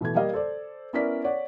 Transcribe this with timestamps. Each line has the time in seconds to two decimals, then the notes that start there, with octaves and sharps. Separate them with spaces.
0.01 B2 E3 A3 G#6
0.15 G3 A#3 G4 D#5 F5
0.33 A4 C5 D5
0.93 B3 C#4 E4 A#4 D5 B6
1.24 C#5 D5 F#5